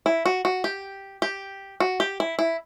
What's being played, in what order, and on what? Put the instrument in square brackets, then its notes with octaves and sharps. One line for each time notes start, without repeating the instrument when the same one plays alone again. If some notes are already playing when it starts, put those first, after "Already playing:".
[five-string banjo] E4
F#4
F#4
G4
G4
F#4
G4
E4
E4